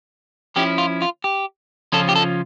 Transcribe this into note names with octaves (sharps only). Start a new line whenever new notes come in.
F3 C#4 E4 G4
F4
F4
G4
C#3 F3 C#4 F4 A4
G4
A4